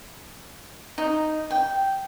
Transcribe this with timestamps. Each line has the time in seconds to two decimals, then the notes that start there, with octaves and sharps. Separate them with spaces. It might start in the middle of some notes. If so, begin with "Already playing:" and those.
0.98 D#4
1.51 G5